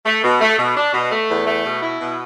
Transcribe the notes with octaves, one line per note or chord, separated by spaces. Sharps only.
A3
B2
A3
B2
D4
B2
A3
E2
A3
B2
E4
B2